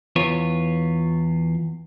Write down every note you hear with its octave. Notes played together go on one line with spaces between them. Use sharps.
E2 F4 B4 C#5